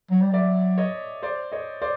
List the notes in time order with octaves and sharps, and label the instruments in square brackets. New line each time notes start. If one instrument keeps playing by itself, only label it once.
[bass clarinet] F#3
G3
[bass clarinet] F#3 [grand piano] D5 E5
[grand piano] C#5 D#5
C5 D5
C#5 D#5
C5 D5